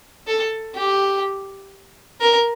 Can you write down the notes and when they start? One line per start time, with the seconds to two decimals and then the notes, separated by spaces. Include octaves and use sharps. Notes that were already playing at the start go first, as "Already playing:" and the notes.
0.27 A4
0.75 G4
2.21 A#4